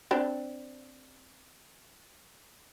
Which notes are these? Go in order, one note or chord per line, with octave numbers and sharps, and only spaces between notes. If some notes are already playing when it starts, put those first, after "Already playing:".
C4 D4